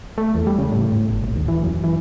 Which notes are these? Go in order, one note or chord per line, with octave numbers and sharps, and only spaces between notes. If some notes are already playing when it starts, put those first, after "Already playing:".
A3
E2
G3
C#3
A2
A2
G1
A#1
D#2
E3
F#2
E3